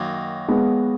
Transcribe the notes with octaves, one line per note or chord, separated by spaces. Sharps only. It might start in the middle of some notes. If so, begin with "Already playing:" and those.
Already playing: F#2 D#3 F#3 A#3
G#3 B3